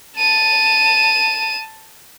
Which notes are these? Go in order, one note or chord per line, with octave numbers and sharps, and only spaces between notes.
A5 D#7